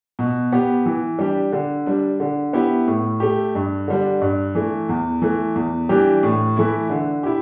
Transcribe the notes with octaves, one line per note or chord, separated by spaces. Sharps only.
B2
B3 G4
E3
G3 D4 G4
D3
G3 D4
D3
B3 E4 G4
A2
A3 G4
G2
D3 G3 D4
G2
E3 A3
E2
E3 A3
E2
E3 G3 D4 G4
A2
E3 A3 E4
D3
E4 G4